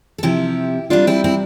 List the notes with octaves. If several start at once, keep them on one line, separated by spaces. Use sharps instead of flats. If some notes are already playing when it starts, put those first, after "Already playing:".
A4
C3 F3 E4 G4
C3 G3 D4 F4
C4 E4
C4 E4